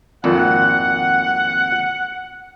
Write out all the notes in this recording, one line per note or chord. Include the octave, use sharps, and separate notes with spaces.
G#1 F2 A#2 F#5